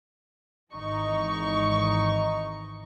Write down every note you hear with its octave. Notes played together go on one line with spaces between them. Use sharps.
G#1 E3 D#4 C#6